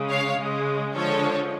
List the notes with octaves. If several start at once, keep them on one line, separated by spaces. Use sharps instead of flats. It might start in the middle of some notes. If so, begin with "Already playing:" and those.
Already playing: C#3 G#3
C#5 F5
C#3 G#3
D3 F3 G#3 A4 C#5